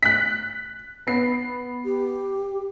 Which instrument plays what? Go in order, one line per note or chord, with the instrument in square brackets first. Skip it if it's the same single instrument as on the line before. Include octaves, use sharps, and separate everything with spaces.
[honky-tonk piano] F#6 B6
B3 C7
[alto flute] G4